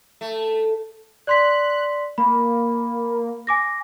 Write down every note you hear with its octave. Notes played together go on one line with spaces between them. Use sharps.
A3
D5 C6 F#6 B6
A#3 B5
G#5 D6 A#6